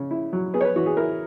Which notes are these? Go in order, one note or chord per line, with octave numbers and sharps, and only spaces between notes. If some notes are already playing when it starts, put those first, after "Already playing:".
Already playing: C#3 C#4
E4
F#3
B3 G#4
C#5
B4
E3 F#4
G#4
E4 A#4